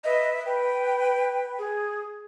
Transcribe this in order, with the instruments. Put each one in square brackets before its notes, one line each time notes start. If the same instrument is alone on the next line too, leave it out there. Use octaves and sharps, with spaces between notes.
[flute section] B4 E5 [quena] D#5
[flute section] B4 [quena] G5
[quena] G#4